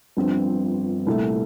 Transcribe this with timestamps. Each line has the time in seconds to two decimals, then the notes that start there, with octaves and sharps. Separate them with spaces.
0.17 G1 G2 F3 C4
1.06 C2 A#2 A3